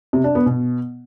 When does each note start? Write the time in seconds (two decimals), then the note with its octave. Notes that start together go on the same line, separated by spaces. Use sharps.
0.13 C3
0.24 D4
0.35 B3
0.46 B2